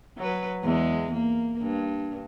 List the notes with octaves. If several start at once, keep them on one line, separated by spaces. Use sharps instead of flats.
F#3 B4
E2 G#3
A#3
G2